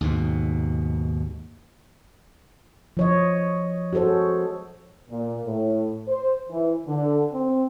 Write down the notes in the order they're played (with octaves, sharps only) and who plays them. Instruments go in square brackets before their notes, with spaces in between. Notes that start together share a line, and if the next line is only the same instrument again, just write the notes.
[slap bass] D#2 G#2 B2
[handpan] F3 C#5 D#5
F#4 G#4 A4 C5 C#5
[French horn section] A#2
A2
C5
E3
D3
C4